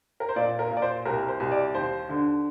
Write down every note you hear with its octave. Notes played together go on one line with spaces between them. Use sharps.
A#4
C5
A#2 D5
A#4
A#2
D5
C5
C2 A#4
C5
C2
D5
D#2 C5
D3